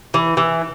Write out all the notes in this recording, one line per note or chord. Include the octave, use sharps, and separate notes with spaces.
E3
E3